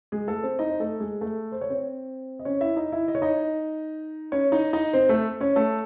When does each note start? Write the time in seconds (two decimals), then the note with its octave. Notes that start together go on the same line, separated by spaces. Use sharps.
0.12 G#3 G#4
0.28 A3 A4
0.43 C4 C5
0.59 D#4 D#5
0.70 C5
0.80 A3 A4
1.00 G#3 G#4
1.21 A3 A4
1.52 C5
1.61 C#5
1.70 C4 C5
2.39 D#5
2.45 C#4 C#5
2.61 E4 E5
2.76 D#4 D#5
2.92 E4 E5
3.08 D#5
3.15 C#5
3.22 D#4 D#5
4.32 C#4 C#5
4.52 D#4 D#5
4.73 D#4 D#5
4.93 C4 C5
5.09 A3 A4
5.41 C#4 C#5
5.56 A3 A4